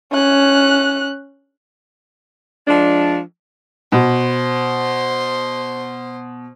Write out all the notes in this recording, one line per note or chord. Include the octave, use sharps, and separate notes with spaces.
C#4 F#6
F3 G#3 D4
B2 C5